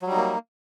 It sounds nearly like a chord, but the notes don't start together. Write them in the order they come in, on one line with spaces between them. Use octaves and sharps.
F#3 G3 D#4 A#3